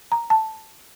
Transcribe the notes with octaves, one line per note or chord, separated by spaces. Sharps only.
A#5
A5